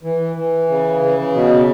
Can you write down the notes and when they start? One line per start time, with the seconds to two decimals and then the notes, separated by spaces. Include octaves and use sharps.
0.03 E3
0.36 E3
0.68 C#3
1.01 C#3
1.33 B2